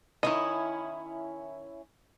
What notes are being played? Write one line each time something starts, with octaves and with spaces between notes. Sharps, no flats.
D#3 C#4 E4 D#5